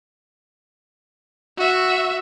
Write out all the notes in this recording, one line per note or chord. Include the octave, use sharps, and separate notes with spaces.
F#4 E5